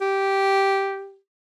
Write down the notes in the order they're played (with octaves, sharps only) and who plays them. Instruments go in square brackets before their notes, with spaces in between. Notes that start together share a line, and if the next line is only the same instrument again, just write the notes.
[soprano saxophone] G4